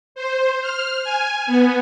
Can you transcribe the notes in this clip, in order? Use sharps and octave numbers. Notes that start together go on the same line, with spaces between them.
C5
F6
G#5
B3